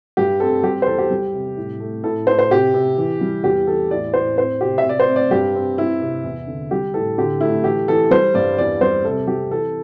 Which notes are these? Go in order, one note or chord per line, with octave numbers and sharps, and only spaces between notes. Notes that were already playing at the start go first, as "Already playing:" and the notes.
G2 G4
C4 A4
G3 G4
C5
E2 A4
G4
G3
C3
A2
A3
A2 A4
A2 C5
C5
C3 G4
C3
E3
G3
E2 G4
E3 A4
A2 D5
A2 C5
C4 C5
C3 G4
E5
C3
D5
C5
C4
D5
G2 G4
C4
C4 E4
C3
E2
D3
G3 G4
A2 A4
D3 G4
A3 E4
E3 G4
E3 A4
G3 C5
G2 D5
E2 D5
G3 C5
C3 A4
G3 G4
E3 A4